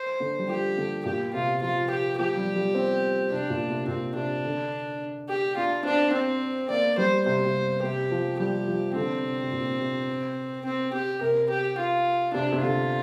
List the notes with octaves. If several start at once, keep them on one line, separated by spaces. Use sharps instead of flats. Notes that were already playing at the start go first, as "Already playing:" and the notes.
Already playing: C5
D3
G3
F3 G4
D3
A#2 G4
C3 F4
F3 F4
G4
F3 G4
G3
G3
C4
C3 D4
A#2
C3
A#2 C4
C3 D4
D3
G4
D4 F4
C4 D4
C4
A#3 D5
G3 C5
C3 C5
C3
C3 G4
F3
G3 G4
F3
D3 C4
C3
C3
A#2
C3
C4
G4
C3 A#4
G4
F4
C3 D4
C3
D3 F4